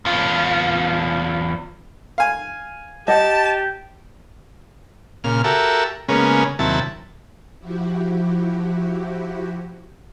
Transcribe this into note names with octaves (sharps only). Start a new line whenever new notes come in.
E2 F4
F5 G#5
G4 D#5 F#5 A5
A#2 C#3 F6
F#4 G4 A4 A#4 E5
C#3 G#3 A#3 B3 C#4
D#2 C3 F#3 E4 A5
F3 E4 F#4 G4